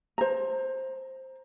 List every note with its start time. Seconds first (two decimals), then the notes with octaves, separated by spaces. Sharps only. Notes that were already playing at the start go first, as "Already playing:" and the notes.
0.18 C5 A#5